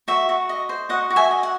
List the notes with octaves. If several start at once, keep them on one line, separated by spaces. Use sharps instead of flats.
F#4 E5
F#4
D#5
C5
F#4 D#5 F#5
F#4
E5 G#5
D#5
F#5